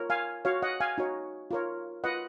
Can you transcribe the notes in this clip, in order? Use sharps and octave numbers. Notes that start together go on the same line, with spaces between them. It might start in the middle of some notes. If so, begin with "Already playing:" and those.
Already playing: F4 A#4 C#5
F5 G#5
F#4 C#5 F5
D#5 F#5
F5 G#5
D#4 F#4 C#5
F4 A#4 C#5
F4 B4 D#5 F#5